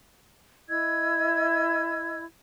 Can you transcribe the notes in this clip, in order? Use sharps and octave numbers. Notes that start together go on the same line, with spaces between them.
E4 D#5 E6 G#6